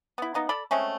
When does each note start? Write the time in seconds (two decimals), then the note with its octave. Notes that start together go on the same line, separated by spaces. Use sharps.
0.18 B3 E4
0.34 A#3 B3 D#4
0.49 A4 D5 B5
0.71 G#3 A3 C4 C#4